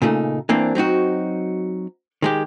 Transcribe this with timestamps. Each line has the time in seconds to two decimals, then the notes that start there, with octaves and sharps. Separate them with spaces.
0.02 A#2 C#3 A3 D#4
0.49 E3 A#3 C4 D4
0.75 F#3 C4 D#4 F#4
2.22 D#3 G#3 G4